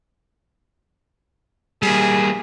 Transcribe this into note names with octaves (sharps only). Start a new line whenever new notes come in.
G3 A#3 G#4